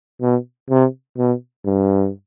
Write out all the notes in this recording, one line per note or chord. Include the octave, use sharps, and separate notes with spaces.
B2
C3
B2
G2